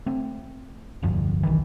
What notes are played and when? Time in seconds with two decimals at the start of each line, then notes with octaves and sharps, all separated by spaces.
0.06 A3 C4
1.03 F1 D2 G2 F3
1.43 B1 D#3 E3